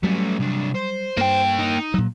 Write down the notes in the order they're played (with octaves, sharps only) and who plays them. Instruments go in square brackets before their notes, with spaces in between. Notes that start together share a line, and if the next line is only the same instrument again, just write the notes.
[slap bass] F#3 G3 [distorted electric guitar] A3 C#4
[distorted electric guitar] C2 D4
C5
[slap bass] G2 [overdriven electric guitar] A#3 G5
[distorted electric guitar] D#4
[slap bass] A#2 F#3